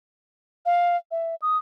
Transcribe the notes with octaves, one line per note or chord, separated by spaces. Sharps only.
F5
E5
D#6